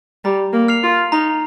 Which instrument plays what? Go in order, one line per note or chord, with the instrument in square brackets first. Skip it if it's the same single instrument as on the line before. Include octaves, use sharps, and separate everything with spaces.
[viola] G3 [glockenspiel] A#5
[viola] A#3
[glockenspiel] F6 C7 F7
[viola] F4
[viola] D#4 [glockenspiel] A#5